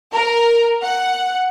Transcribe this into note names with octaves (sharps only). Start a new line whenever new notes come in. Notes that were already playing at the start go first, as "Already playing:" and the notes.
A#4
F#5